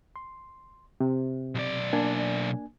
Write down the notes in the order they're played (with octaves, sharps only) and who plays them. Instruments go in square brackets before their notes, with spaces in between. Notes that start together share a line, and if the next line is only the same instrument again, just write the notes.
[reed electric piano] C6
C3
[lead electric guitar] B1 D5
[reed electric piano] A#3 D4 G#5